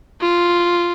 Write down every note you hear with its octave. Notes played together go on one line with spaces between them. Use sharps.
F4